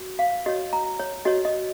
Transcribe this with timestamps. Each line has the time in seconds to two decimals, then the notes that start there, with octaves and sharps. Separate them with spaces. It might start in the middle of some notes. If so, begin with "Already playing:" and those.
Already playing: F#4
0.19 F5
0.46 F#4 C#5 D#5
0.73 A#5
0.99 C#5
1.25 F#4 C#5 D#5
1.45 D#5